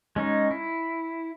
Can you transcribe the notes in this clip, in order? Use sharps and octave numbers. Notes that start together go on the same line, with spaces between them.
G#3 C#4 D#4
E4